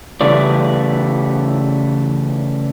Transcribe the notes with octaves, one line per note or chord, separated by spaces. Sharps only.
C#3 E3 G3 A3 D5